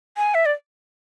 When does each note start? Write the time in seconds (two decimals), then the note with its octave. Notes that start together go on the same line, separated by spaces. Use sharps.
0.17 G#5
0.35 E5
0.46 D5